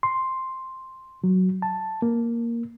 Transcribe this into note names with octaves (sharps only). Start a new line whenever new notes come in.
C6
F#3
A5
A#3